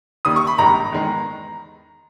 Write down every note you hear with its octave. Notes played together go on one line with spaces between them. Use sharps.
D#2 D#3 G3 D#6
C#6
B5
A#1 G#2 D#3 G3 A#5
E2 D#3 G#3